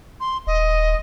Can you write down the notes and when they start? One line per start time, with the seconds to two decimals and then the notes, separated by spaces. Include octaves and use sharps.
0.20 C6
0.47 D#1 D#5